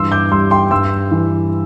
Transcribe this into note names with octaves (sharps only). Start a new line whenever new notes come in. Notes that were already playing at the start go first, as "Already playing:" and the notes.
Already playing: G2 E3 C6 E6
D6 G6
G3 C6 E6
G5 C6
G2 C6 E6
E3